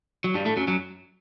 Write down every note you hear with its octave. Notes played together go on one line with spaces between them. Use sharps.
F#3
G2 G3
A2 A3
F#2 F#3
F#2 F#3